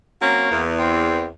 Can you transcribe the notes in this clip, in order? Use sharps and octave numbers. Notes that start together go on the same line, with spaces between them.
F#3 A#3 C4 C#4
E2
C4